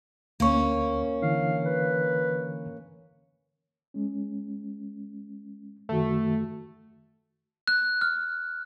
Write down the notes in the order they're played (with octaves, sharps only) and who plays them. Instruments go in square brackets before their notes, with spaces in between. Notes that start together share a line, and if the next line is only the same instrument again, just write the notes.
[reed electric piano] D2 C#6 [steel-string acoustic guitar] A#3 C#4
[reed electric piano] D3 E3 [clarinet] F5
[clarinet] B4
[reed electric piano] G#3 C#4
[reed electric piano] F#2 D#3 F#4 [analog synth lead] A3
[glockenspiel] F#6
F6